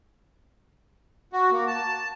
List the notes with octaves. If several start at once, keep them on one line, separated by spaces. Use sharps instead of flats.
F#4
A#3
A5